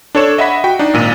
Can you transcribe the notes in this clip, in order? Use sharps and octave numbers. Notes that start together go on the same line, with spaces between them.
D4 A4 C#5 C#6 E7
D#5 E5 F#5 B5 B6
F#4 G5
D4 D#4
G#1 A#2 D#7